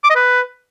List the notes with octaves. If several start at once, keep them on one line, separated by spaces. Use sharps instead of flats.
D6
D#5
B4